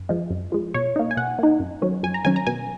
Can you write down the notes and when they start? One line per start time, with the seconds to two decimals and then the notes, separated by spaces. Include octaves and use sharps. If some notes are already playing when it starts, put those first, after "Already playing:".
Already playing: F#2
0.09 F3 G#3
0.30 F#2
0.52 F3 G#3
0.74 B2 C#5
0.96 A#3 D#4
1.11 G#5
1.17 B2 F#5
1.39 A#3 D#4
1.60 F#2
1.82 D#3 F#3 C#4
2.03 F#2 G#5
2.14 A#5
2.25 D#3 F#3 C#4 G#5
2.36 A#5
2.47 B2 G#5